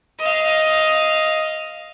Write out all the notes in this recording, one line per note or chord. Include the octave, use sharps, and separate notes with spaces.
D#5 F5